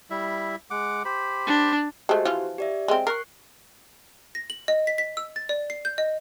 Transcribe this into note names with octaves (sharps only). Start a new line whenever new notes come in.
G3 E4 E5
G#3 F#5 D6
G4 C5 B5
D4
G#3 A3 F#4 G4 C5
E3 F3 F4
G4 D5 E5
G#3 C4
A#4 C#6 F#6 C7
A#6
F#7
D#5
B6
B6
E6
A6
D5
C7
G6
D#5